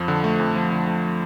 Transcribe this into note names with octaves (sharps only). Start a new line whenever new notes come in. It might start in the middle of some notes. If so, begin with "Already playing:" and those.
Already playing: F2 F3
D3
A3
F2
F3
D3
A3